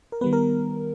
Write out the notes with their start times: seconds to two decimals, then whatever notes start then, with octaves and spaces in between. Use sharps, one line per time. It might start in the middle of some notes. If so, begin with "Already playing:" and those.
0.12 A#4
0.21 D#3 G3 B3 B4
0.33 A#4